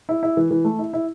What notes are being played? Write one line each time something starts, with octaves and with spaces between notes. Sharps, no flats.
E4
E4
E3
E3
A3
E4
E4